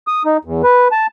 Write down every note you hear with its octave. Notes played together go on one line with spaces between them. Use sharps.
D#6
D#4
E2
B4
A5